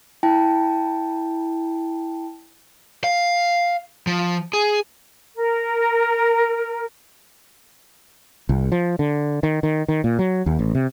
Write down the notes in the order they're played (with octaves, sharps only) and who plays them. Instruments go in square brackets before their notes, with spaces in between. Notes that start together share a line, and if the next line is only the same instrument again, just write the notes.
[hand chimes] E4 G5 A5
[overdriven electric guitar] F5
F3
G#4
[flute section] A#4
[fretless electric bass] C2
F3
D3
D#3
D#3
D#3
A#2
F#3
D#2
A1
C3